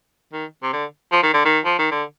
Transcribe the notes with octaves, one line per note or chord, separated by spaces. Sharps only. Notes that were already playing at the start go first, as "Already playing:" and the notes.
D#3
C3
D3
F3
D#3
D3
D#3
F3
D#3
D3